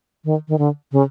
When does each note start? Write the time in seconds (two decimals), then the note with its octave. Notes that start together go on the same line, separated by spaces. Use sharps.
0.25 D#3
0.48 D#3
0.58 D3
0.92 C#3